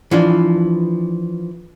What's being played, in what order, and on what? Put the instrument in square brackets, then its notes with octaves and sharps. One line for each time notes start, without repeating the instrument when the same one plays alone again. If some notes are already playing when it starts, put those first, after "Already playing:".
[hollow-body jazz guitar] E3 F3 D4